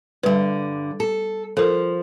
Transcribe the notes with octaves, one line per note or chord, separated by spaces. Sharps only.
G2 D3 G3 B4
A4
F3 A4 A#4